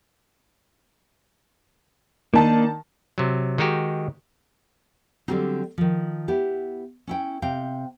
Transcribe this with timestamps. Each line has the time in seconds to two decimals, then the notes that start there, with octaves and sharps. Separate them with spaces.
2.34 D#3 A#3 D4 D#4 A5
3.18 C3 F#3
3.58 D#3 G#3 D#4 F#4 G4
5.28 D3 F#3 G3 C4 D#4
5.78 D#3 F3
6.28 B3 E4 G4
7.07 C#4 E4 G5
7.42 C3 F5 G5